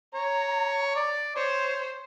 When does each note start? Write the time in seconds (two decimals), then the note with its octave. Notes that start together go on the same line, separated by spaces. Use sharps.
0.14 C#5 A#5
0.96 D5
1.36 C5 C#5